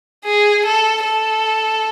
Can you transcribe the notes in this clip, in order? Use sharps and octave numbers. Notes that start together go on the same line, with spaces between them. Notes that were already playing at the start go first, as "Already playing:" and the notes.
G#4
A4
A4